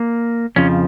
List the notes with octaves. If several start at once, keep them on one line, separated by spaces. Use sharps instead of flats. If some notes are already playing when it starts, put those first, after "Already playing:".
Already playing: A#3
F2 C#3 F3 C#4